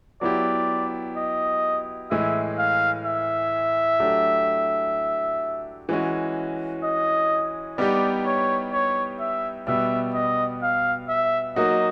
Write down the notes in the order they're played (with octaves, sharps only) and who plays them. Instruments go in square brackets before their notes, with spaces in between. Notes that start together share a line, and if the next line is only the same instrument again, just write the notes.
[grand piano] F#3 B3 E4 G4 [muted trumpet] D5
[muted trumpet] D#5
[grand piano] A2 E3 G#3 [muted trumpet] E5
[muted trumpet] F5
E5
[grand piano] F#3 A3 D4 G4
E3 G#3 C#4 F#4
[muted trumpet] D#5
[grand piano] G3 B3 D#4 G4 [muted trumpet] D5
[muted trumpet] C#5
C#5
E5
[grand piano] B2 G3 B3 [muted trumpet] E5
[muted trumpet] D#5
F5
E5
[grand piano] F#3 A#3 D#4 F#4 [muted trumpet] D#5